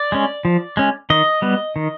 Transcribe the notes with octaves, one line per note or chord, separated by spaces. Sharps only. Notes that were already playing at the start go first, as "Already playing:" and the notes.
Already playing: D5
G#3 C#4
F3
G#3 C#4
D#3 D#5
G3 B3
D#3